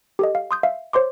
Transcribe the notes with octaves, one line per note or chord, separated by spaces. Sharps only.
G4 A4 D#5
F5
C6 D#6 G6
E5 F5
C5 C#5 C6 D6